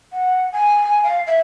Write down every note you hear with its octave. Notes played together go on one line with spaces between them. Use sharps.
F#5
G#5
F5
E5